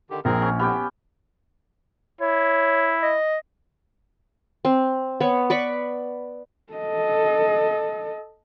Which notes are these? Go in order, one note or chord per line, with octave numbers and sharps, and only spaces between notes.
D3 D#3 G4
A#1 C4 G#4 A#4
C#4
A2 B3 G4 G5
E4 C#5
D#5
C4
B3 C#5
B4 D5 B5 C#6
A4 D#5